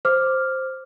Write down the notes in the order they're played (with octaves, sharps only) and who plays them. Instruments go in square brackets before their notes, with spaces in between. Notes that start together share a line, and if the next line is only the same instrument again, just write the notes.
[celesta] C5 D6 F6